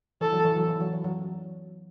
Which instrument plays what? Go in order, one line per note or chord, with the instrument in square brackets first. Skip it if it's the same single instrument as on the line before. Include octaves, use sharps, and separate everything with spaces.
[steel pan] E3 [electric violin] A4
[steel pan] F#3
E3
F#3
E3
F#3
E3
F#3